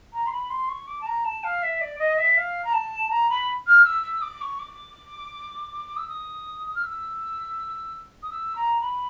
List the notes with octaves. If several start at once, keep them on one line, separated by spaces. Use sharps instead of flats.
A#5
C6
B5
C6
C#6
D6
A5
A#5
A5
F5
E5
D5
D#5
E5
F5
A#5
A5
A#5
B5
F6
E6
E6
D6
C#6
D6
E6
D#6
F6
E6
D#6
E6
A#5
B5